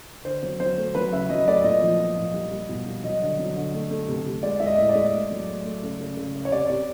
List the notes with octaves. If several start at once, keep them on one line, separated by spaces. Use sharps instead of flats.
D3 C5
F#3
F#3 C5
A3
F#3 B4
C#3 E5
F#3 D#5
A3 D5
A#2 D#5
F3
F3
A#2
G3
G3
B2
G3
F#3 D#5
D3
F#3
D3
A3
A3
C3
C3
G#3 D5
G#3 E5
D#5
A2
D5
G#3
A3
F#3
A3
A3
C#3
C#3
C#3
C#3
C#5
C3 D5
C3